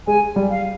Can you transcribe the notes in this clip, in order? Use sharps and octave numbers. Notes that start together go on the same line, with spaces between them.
G#3 G#5
G3
F5